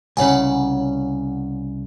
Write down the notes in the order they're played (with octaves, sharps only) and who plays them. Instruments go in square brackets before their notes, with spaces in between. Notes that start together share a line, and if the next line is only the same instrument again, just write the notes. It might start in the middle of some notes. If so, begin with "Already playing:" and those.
[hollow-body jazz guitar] C2 A#2 C#3 [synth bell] C#5 F#5 G#5